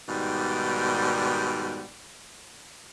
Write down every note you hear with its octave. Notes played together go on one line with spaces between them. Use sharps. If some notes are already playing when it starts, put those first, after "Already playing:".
G#2 B2 D#3 G3